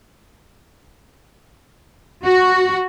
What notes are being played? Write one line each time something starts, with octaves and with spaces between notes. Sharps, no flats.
F#4